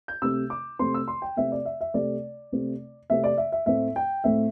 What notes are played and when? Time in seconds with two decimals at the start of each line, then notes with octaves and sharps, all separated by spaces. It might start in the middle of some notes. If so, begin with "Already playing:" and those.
0.08 G6
0.22 C3 A3 C4 E6
0.50 D6
0.79 C3 A3 C4 C6
0.94 E6
1.08 C6
1.22 G5
1.36 C3 A3 C4 E5
1.52 D5
1.65 E5
1.81 E5
1.94 C3 A3 C4 D5
2.52 C3 A3 C4
3.10 C3 A3 C4 E5
3.24 D5
3.38 E5
3.52 E5
3.66 A2 A3 C4 E5
3.96 G5
4.24 A2 A3 C4 E5